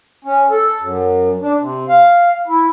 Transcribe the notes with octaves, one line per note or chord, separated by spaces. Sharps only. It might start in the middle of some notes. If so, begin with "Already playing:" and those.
C#4
A4
F#2
D4
C3
F5
E4